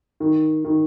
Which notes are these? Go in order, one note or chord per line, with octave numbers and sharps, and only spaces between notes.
D#3
D#3